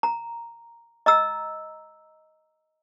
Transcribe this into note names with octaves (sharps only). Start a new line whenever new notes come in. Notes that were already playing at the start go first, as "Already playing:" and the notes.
A#5
D#5 A#5 E6